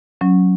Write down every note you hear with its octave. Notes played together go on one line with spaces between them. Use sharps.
F#3 C#4